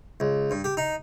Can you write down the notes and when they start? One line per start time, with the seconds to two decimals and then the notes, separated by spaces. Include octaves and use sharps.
0.20 C#2
0.51 G2
0.64 G4
0.77 D#4